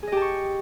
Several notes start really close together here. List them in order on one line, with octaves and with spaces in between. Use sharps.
G#4 D#5 G4 A5 C#6